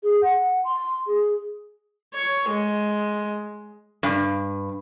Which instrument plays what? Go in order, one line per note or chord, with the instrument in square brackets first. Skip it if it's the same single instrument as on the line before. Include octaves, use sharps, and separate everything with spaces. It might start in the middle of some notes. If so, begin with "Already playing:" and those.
[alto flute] G#4
F#5
C6
G#4
[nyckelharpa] C#5
G#3
[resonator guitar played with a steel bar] G2